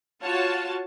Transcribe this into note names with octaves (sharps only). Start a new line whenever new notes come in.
F4 F#4 C#5 A5